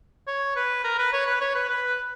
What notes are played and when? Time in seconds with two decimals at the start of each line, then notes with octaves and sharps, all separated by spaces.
0.27 C#5
0.56 B4
0.84 A#4
0.98 B4
1.13 C#5
1.26 B4
1.41 C#5
1.55 B4
1.69 B4